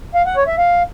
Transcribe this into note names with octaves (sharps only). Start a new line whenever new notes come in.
F5
F#5
C#5
E5
F5